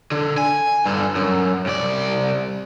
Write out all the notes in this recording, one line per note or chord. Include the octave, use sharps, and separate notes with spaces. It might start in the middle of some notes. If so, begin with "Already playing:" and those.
D3
G#5
G2 D3
F#2
C2 D5